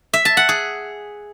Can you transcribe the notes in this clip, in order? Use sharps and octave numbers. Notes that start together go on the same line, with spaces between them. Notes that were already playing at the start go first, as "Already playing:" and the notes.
E5
A5
F#5
G#4